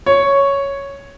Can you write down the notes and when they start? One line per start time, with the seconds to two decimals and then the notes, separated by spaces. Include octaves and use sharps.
0.06 C#5